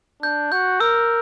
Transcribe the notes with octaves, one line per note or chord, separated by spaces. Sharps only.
D4 G6
F#4 G6
A#4 E6